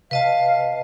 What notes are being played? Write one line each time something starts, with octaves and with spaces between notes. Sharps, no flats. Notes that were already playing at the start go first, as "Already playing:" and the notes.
C3 B4 D#5 F5 A5